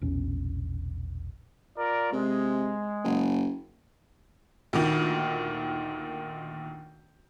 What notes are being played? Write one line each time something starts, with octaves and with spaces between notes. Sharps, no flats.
E1 A#1 C#4
F4 A#4 D5
C3 G#3
F#1
D2 A#2 D#3